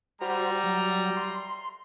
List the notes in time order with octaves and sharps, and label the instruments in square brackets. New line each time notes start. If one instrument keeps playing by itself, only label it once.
[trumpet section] G3 A#5 [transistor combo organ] F#4 C5
[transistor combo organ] F#3
C6